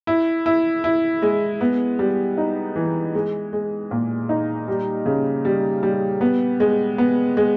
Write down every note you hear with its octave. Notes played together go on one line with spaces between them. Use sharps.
E4
E4
E4
G#3
B3
G3
D#4
E3
G#3
G#3
A#2
D#4
G3
C#3
G3
G3
B3
G#3
B3
G#3